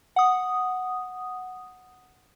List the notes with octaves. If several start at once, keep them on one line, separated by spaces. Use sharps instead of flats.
F#5 D#6